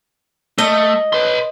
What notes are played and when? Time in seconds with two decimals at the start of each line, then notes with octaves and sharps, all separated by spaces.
0.58 A3 D#5
1.13 B4 C6